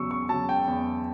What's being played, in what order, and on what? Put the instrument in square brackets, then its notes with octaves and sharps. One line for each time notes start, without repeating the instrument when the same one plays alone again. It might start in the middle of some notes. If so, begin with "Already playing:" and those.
Already playing: [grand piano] E2 C#3 F#3 C#6 E6
C#6
C#3 F#3 A5
G5
E2